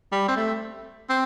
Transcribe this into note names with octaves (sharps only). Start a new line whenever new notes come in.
G3
C4
A3
C4